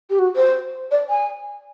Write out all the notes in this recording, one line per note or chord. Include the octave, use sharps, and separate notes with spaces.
G4
F#4
C5
D5
G#5